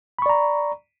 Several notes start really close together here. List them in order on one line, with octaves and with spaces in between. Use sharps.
B5 C#6 D5 A#5